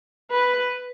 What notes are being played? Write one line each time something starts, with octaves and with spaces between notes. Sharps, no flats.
B4